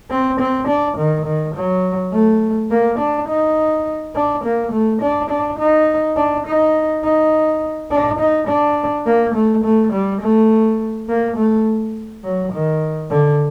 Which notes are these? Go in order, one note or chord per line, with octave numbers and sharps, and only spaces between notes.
C4
C4
D4
D#3
D#3
F#3
A3
A#3
D4
D#4
D4
A#3
A3
D4
D4
D#4
D4
D#4
D#4
D4
D#4
D4
A#3
A3
A3
G3
A3
A#3
A3
F#3
D#3
D3